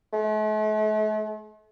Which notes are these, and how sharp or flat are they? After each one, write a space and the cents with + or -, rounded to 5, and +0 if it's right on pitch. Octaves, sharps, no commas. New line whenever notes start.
A3 -45